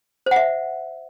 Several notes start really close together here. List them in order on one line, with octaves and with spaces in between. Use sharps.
C5 F#5 E5